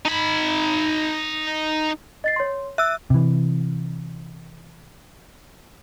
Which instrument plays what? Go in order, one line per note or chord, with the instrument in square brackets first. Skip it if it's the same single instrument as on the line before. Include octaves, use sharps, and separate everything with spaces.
[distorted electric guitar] D#4 B5
[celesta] D#5 A6 C7
C#5 C6
[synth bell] E5 E6 [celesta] F#6
[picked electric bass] C3 E3